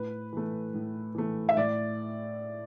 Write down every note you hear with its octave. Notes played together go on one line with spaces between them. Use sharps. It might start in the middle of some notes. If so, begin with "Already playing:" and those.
Already playing: A2 B4
E3 A3
A2
E3 A3
E5
A2 D5